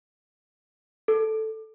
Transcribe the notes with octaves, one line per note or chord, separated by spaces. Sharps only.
A4